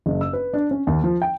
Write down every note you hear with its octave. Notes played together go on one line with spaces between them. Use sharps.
F#1
E6
B4
D4
C#4
D#2
F3
G5